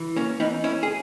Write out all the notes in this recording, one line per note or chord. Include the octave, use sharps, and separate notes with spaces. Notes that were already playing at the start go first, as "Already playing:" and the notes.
Already playing: E3
A#3 C#4
E3 B3 D#4
C#4 E4
G#4